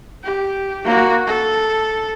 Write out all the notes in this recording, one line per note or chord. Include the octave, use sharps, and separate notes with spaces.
G4
A#3 F#4
A4